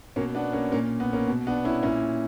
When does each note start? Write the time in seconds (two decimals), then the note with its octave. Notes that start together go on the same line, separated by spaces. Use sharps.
0.16 B2 A#3 C#4
0.35 B3 D4
0.53 A#3 C#4
0.72 A#2 A#3 C#4
1.00 B3
1.13 A#3 C#4
1.28 B2
1.47 B3 D4
1.65 C#4 E4
1.83 A#2 C#4 E4